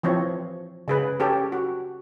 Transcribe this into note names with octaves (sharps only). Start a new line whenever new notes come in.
E3 F3 C4 C#5
C#3 G#4 B4
C#4 G4 A4
F#4